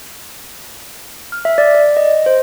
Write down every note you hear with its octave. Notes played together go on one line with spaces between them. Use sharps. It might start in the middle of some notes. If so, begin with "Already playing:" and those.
F6
E5
D5
D5
D#5
C5